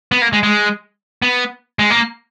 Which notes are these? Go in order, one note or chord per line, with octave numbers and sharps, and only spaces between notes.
B3
A#3
G#3
G#3
B3
G#3
A#3